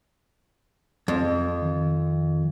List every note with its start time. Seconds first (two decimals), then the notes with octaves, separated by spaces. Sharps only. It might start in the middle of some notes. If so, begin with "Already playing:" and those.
1.08 F2
1.62 D#3